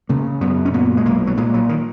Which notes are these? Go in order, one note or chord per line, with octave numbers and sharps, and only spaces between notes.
C#3 A#3
F#2 B3
C#4
A#2 B3
G#3
B1 A#3
F#3
A#2 G#3
F#3
D#3